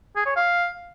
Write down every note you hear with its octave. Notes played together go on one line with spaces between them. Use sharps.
G#4
C#5
F5